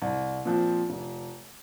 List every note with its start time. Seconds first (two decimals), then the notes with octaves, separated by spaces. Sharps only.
0.02 C2
0.45 A#2 F3 C4
0.90 F1